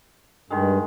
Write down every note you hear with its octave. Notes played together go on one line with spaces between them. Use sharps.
G2 D#3 G#3